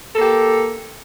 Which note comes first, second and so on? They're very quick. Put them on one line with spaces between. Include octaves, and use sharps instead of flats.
A4 A#3 G4